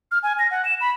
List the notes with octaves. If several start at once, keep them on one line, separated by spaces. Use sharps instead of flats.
F6
G#5
A#6
F#5
E7
B5